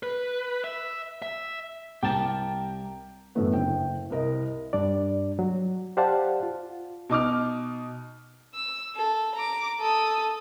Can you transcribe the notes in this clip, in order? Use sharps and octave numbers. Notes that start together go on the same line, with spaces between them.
B4
E5
E5
C2 G4 A#4 G5 A5
F#2 A2 D3 E3 A3 B3
F#1 G5
C2 A#4 D#5
G2 G3 D4 D5
F#3
G4 C5 D5 F5 F#5 A5
F4
B2 D#4 D6 F6
E6
A4
A#5 D6
A4 D#6